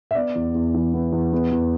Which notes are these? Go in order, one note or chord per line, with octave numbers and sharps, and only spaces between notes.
E5
B3 D5
E2
E2
E3
B3
E2
B3
E2